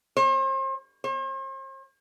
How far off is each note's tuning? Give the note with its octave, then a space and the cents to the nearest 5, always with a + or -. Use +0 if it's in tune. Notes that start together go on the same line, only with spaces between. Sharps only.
C5 +40
C5 +45